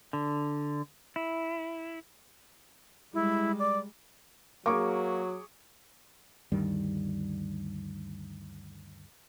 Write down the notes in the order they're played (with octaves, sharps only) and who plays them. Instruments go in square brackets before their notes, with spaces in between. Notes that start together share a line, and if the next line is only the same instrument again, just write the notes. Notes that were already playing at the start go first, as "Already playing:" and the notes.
[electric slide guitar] D3
E4
[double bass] G3 G#3 [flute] E4
[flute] D5
[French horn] F#3 [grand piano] A#3 [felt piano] G#4 C#6 D6
[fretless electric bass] D2 G2 D#3 G3